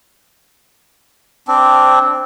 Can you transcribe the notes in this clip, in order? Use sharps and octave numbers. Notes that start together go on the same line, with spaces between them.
C4 D4